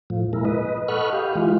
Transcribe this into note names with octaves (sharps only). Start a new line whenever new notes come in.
A2 F3
A#2 G#3 E4 A#4
B4 D#5
A4 D#5 F#5 B5 C#6 F6
G4 F5
E3 G#3 F4